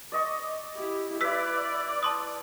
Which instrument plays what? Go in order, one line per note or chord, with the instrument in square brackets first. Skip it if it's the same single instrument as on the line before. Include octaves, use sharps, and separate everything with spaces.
[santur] D5 D#5 C#6
[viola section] E4 G4
[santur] E4 B4 [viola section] D5 [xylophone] E6 B6
[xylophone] A5 C6 D#6